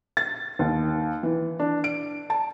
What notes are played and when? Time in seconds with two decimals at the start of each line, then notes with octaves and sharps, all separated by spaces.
0.17 A6
0.59 D#2
1.23 E3
1.59 D4
1.84 D7
2.30 A5